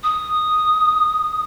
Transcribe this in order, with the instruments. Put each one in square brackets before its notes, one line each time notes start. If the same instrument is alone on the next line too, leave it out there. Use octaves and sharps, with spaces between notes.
[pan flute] D#6